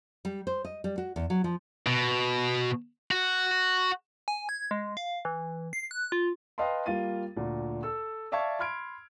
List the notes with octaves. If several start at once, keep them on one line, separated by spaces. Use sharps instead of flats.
G3
C5
D#5
G3
F#4
E2
F#3
F3
B2
F#4
G#5
G#6
G#3
F5
E3
C7
F#6
F4
B4 D#5 F5 G5 A5 C6
G3 A#3 F4 F5 A6 D#7
D2 A#2
A4 E6
D5 E5 F5 A5 C#6 G#6
B5 C6 F6 G#6 D7